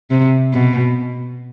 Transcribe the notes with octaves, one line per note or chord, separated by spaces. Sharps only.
C3
B2